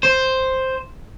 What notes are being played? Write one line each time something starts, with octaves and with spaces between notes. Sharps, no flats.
C5